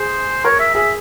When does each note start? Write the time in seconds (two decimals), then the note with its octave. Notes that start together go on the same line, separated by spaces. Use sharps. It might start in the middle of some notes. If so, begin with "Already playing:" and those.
Already playing: G#4 C5
0.45 A#4 C#5
0.60 E5
0.75 G#4 E5